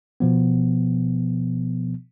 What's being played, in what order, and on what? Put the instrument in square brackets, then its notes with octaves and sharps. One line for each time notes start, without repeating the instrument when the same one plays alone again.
[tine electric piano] B2 F3 B3